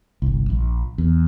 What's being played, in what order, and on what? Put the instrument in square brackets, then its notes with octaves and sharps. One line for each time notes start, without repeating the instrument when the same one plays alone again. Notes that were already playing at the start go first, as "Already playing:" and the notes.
[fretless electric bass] G1 C2
A#1
E2